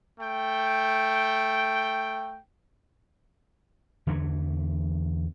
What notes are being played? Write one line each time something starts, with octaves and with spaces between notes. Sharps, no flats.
A3 G5
E2 D3 E3 A3